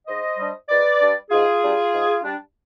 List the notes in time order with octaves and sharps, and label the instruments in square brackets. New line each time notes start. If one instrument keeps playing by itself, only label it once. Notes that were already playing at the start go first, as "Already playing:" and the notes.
[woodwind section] G#2 C5 D#5
G3 D4
G#2 B4 D5
G3 D4
G#2 F4 G#4
G3 D4
G#2
G3 D4